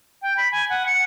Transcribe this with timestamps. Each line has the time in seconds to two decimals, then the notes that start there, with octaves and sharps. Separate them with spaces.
0.22 G5
0.37 B5
0.52 G#5
0.69 F#5
0.86 C#7